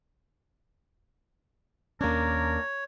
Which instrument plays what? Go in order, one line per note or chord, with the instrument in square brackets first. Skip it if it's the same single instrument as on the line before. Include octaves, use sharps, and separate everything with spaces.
[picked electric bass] D#2 C#4 [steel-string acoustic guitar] A#3 D4 [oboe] A#4 [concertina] C#5